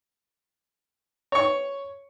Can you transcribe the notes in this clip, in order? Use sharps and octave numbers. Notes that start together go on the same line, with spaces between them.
C#5 C#6